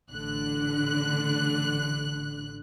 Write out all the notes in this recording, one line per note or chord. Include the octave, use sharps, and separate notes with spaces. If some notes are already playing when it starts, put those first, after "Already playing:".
A1 D3 F#6